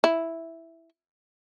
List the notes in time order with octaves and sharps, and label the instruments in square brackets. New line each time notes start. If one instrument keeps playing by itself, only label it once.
[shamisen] E4